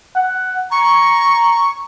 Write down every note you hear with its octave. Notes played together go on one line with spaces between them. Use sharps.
F#5
A#5 C#6